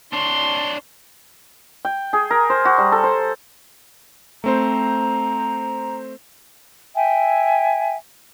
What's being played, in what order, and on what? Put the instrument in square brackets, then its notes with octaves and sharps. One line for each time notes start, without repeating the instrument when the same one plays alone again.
[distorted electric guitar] D4 C#5 [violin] C6
[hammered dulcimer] G5
G#4
A#4
C5
F#4
G3
A4
C5
[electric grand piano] A3 C4 C5 [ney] A#5
[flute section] E5 G5 G#5